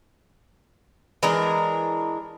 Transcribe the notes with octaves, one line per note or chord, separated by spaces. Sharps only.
E3 G#3 D4 A#4